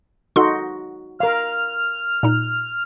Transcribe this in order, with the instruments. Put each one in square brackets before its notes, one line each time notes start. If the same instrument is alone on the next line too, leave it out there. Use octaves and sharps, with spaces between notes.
[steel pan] D#4 F#4 [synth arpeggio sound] A4 C6
[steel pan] A#4 F5 [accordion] F6
[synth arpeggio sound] A#2 D#4